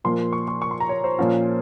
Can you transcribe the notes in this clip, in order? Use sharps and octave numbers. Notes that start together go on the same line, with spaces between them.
A#2 F3 A#3 C6
C#6
C#6
C#6
C6
A#5
C#5
C5
A#2 F3 A#3 C#4 F4